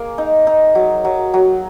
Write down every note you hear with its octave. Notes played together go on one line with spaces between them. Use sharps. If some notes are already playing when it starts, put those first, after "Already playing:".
Already playing: A#3 G#4
D#4
D#4
F#3
F#3
F#3